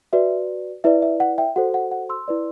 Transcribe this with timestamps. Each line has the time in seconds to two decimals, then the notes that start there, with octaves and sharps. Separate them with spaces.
0.13 F#4 B4 D5 E5
0.84 E4 B4 D5 E5
1.02 E5
1.20 F#5
1.38 E5 G5
1.56 F#4 A4 C5 F#5
1.74 F#5
1.91 F#5
2.09 C6 E6
2.28 E4 B4 D5